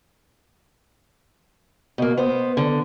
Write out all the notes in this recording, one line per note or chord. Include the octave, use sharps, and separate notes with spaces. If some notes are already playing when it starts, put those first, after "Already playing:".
B2 A#3
B3 C5
D3